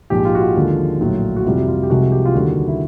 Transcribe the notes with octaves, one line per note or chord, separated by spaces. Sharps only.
A#1 G#2 F3 G#3 G4
F4
F#4
F4
D#2 D3 F3 G#3
A#1 A2 F#3
F#4
F2 C3 E3 G3 F4
F#4
F4
G4
C2 C3 F3 G#3 F#4
G4
F4
D#2 D3 G3 F#4
E4